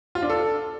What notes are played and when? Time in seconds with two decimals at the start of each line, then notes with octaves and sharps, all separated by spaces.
0.15 F4
0.22 D4
0.30 A4